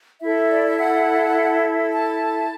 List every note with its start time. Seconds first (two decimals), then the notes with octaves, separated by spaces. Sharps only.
0.21 E4 A4 E5
0.51 D5
0.64 E5
0.78 F#5
1.92 A5